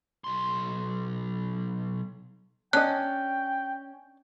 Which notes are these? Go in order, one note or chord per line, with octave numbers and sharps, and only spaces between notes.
B1 C6
C#4 D4 D#5 G5 F#6